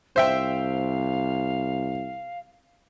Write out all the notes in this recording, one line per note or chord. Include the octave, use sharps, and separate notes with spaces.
C2 C5 E5 F5 G5